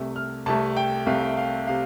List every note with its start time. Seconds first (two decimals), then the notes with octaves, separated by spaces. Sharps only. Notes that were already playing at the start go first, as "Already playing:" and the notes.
Already playing: C2 C3 A3
0.16 F6
0.46 C2 C3 A3 A5
0.77 G5
1.06 C2 C3 A3 F5
1.37 F5
1.67 C3 F5